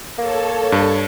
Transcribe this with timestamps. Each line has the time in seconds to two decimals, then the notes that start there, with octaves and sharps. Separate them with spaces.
0.18 A#3 A4 C#5 A5
0.72 G2